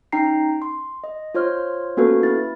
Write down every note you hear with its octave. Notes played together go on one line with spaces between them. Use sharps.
C#4 D#4 G5 A#5 C7
C6
D#5
F4 C5 C#5 C6 F6
A#3 B3 C#4 F#4 A4 B4
E4 A6